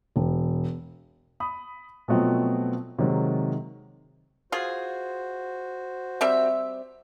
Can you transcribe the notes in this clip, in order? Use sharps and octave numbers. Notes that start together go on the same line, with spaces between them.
E1
B5 D#6
B2 F3 F#3 A3 B3 C4
C3 D#3 F#3 G#3
F4 F#4 G#4 C5
G3 C4 E5